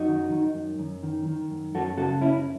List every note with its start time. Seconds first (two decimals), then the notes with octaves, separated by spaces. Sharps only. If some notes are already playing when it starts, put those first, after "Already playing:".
Already playing: F#2 D#4 F#4
0.08 D#3
0.32 D#3
0.55 F#2
0.79 F#2
1.03 D#3
1.26 D#3
1.51 F#2
1.75 F#2 F#4 A4
1.97 C#3 F#4 A4
2.21 F#2 C#4 E4